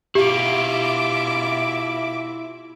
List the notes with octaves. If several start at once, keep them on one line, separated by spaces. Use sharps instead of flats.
B2 E4 F4 G4 E5 D6